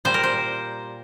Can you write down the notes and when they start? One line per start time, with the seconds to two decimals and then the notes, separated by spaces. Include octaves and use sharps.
0.05 A#2 G3 C5
0.14 A#4
0.24 C5